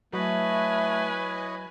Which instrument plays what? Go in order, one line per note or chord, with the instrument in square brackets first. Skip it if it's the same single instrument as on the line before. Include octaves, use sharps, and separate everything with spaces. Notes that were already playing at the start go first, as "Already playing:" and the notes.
[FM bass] F#3 [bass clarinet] A3 [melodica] E4 C#5 D#5 [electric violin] B4 G#5